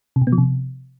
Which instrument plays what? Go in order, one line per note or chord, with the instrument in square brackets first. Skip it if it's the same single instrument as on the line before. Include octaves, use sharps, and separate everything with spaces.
[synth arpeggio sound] C3
B2
B3
F3
C3